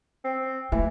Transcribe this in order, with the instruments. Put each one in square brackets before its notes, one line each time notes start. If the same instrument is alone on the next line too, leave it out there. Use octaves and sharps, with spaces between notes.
[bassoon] C4
[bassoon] E3 [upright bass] A3